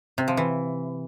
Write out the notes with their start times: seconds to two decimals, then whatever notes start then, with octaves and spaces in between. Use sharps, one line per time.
0.18 C3
0.28 F3
0.37 E3